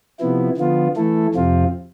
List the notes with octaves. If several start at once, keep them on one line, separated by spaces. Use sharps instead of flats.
C3 F3 B3 E4
D3 F3 B3 F4
E3 A3 E4 A4
F2 C3 F3 C4 F4